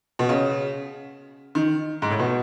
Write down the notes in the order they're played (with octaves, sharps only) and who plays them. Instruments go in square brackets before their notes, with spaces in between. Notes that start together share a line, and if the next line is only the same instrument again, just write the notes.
[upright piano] B2
C#3
D#3
G#2
A2
B2